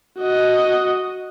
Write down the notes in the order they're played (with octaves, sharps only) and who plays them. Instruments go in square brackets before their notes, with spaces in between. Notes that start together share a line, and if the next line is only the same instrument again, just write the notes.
[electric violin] F#4 D#5